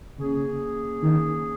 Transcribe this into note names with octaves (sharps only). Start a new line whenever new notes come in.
C#3 A#3 C#4 G#4
D#3